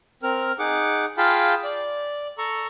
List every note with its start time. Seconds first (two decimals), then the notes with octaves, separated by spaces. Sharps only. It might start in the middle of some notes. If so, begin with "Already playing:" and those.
0.23 C4 A#4 F6
0.59 D#4 G#4 F#5 D6
1.18 F4 G#4 F5 G5 A5 B5
1.64 D5
2.38 A4 A#5 C#6